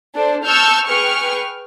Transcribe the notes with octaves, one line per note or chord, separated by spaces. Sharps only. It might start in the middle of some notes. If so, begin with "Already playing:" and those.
D4 A4 C5
A5 C#6 E6 F6 G6
G#4 B4 G5 C#6 F6